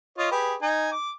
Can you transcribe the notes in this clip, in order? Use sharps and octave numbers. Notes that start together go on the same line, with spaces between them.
F4 C#5 D#5
G4 G#4 B4
D#4 G#5
D6